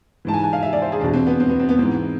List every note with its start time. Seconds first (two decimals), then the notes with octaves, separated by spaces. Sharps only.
0.25 G#2 E3 A5
0.34 G#5
0.44 G#5
0.53 F5
0.63 E5
0.73 D5
0.82 C5
0.92 G#4
1.01 E2 B2 D4
1.14 C4
1.27 B3
1.40 C4
1.49 B3
1.60 C4
1.69 B3
1.79 G#2 E3 C4